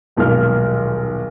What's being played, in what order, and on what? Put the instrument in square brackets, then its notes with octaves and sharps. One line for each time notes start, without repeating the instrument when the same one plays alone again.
[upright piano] D#1 B1 G#3 A#3 F6